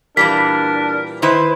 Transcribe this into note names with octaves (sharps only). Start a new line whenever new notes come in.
A#2 E3 G3 D4 A#4 B6
D#3 E4 B4 C5